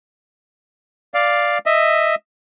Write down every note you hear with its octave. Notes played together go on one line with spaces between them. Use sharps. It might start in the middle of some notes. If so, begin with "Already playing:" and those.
D5 F5
D#5 E5